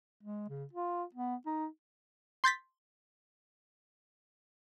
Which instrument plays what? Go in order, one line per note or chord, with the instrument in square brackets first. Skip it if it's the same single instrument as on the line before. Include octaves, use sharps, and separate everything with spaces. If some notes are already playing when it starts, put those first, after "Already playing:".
[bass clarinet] G#3
C#3
F4
B3
D#4
[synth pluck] C6 G6 A6 B6